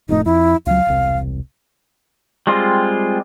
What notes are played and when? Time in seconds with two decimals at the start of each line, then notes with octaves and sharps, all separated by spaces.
0.09 F1 F2 A2 D#4
0.25 F2 E4
0.66 C#2 F#3 F5
0.87 E1 C2
2.47 G3 G#3 C4 F4